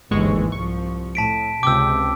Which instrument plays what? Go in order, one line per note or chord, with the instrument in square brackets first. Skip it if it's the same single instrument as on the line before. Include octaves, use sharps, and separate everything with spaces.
[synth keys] G1 G#3 C#6 [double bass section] D#2 G#2 E3
[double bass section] C2 F3 [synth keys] C#6
[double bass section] A2 [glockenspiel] A5 B6 D7
[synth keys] C#2 G5 [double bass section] C3 [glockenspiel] D6 E6